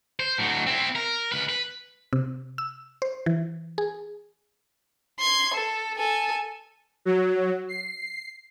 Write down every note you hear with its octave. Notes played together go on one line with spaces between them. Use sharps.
C5
A2 F#3
C4 E4
A#4
C#2 B4
B4
C3
E6
C5
E3
G#4
C6 G#6
A4
A4 G#5
F#3
C7